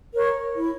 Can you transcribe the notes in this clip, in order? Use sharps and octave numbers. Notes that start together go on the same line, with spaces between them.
A#4 C#5
E4